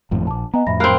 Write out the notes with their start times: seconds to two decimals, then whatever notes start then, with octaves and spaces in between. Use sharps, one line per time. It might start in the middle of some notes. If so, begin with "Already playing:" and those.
0.11 G#1 F2 A2
0.27 A#1 A5 D6
0.54 B3 D#5 G#5 A#5
0.67 F2 A2 E5 B5 A#6
0.80 A#3 C4 B5 F6 F#6